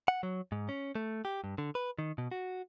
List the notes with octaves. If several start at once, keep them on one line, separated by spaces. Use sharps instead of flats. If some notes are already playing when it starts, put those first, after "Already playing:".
F#5
F#3
G#2
C#4
A3
G4
G2
D3
B4
D#3
B2
F#4